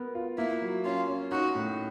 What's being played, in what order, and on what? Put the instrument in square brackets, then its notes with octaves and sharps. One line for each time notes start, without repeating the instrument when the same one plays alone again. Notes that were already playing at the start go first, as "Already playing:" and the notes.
Already playing: [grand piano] B3 A#4
F4
[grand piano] A#3 [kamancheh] E4
[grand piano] F#3
[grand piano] C#4 [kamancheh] F4
[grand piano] C#4
[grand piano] D#4 [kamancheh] F#4
[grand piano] A2